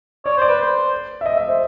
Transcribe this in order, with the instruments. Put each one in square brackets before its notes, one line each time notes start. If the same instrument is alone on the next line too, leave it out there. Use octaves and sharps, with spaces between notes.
[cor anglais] C#5 [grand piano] D5
[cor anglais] C5 [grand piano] D5
[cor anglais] B4
C5
[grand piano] E5
D#5
E5
C5